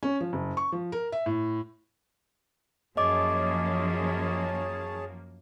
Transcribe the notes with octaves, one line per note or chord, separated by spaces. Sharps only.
C#4
F3
F#1
C#6
F3
A#4
E5
A2
F#2 F3 A#3 G#4 C#5 D#5 A5 D6